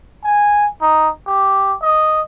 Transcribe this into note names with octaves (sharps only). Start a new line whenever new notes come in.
G#5
D#4
G4
D#5